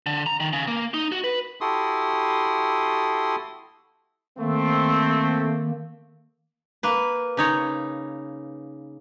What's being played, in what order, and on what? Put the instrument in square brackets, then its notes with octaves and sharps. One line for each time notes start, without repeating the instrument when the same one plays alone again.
[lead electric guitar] D3
A#5
D#3
C#3
A#3
D#4
F#4
B4
[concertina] E4 F#4 G4 A4 C6 D#6
[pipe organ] D#3 A#3 [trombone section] A3 C4
[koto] A#3 B4
C#3 D#4 C#5